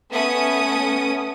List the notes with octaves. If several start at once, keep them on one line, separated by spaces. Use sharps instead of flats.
A3 B3 C#4 D#6